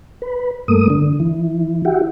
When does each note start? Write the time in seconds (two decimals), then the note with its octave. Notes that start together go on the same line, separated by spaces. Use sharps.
0.22 B4
0.68 G2 A3 A#3 D#6
0.90 D3
1.20 E3
1.85 E4 F#4 G4